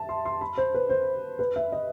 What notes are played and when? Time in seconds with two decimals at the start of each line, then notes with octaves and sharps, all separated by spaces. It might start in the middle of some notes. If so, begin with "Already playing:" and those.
Already playing: E5 A5
0.09 C6
0.25 C6
0.41 B5
0.58 C5
0.74 B4
0.90 C5
1.39 B4
1.56 E5
1.72 D#5